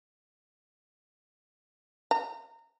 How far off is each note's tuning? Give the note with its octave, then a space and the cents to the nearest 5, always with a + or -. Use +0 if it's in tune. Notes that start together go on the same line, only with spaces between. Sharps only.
A#5 -25